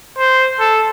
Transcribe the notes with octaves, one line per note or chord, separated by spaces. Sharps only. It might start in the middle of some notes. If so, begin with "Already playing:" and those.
C5
A4